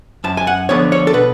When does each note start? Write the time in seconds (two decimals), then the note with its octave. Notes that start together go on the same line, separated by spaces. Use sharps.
0.24 F#2 A5
0.37 G#5
0.47 F#5
0.69 D3 F3 B3 C#5
0.92 C#5
1.07 A4
1.13 B2 B4